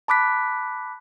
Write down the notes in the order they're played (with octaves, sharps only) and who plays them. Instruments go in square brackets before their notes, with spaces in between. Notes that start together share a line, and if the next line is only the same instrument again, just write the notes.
[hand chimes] A5 B5 D6 F#6 B6